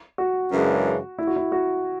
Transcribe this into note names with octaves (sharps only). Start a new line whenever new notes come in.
F#4
F#2 C#3 E3 G#3 D4
E4
F#4
E4
F#4